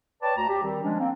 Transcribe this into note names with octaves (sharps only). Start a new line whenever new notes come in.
B4 C#5 D5 G5 A5
D2 A#5
G4
D#3 G3 C4
F3 G#3 C#4 D4
A#3 C4